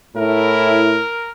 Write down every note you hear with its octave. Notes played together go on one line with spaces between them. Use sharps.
A2 E4 A#4